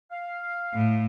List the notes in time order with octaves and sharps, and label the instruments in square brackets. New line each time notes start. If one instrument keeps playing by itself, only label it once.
[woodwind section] F5
[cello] A2